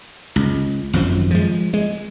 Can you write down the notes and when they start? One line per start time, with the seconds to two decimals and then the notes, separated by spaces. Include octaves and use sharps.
0.36 C#2
0.93 G#1 F#2 F3
1.31 F3 G#3
1.74 G#3